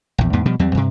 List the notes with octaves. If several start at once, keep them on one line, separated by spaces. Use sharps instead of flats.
A#1 E2
E2 G#2 B3
B2 F3 G3
E2 F#3 G3 C4
G2 C3